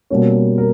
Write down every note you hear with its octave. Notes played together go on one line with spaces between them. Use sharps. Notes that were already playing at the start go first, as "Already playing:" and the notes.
B2 G3 A#3 C#4
A#4